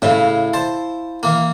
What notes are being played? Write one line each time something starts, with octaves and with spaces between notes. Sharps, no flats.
A2 C#3 E4 F5
C5 A5
E3 A#3